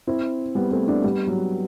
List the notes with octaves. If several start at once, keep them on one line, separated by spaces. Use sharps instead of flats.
C4 E4
G3 B3
A3 C4
B3 D4
G3 B3
F#3